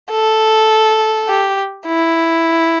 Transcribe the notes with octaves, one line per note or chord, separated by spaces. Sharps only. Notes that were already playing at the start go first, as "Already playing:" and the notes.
A4
G4
E4